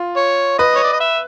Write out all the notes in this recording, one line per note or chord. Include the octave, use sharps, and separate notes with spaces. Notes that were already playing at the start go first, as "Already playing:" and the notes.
Already playing: F4
C#5
B4 D#5
C#5
D5
D#5
E5